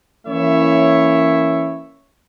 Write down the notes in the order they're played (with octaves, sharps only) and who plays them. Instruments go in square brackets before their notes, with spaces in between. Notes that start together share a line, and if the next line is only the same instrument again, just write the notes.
[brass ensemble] E3 A#3 C#4 E4 C#5 E5